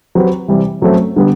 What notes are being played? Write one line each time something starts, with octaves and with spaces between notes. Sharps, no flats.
F#3 C4 G4 B4
C3 E3 G3
F#2 F#3 A3 C4
D3 G3 B3